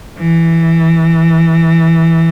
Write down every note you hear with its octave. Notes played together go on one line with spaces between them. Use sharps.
E3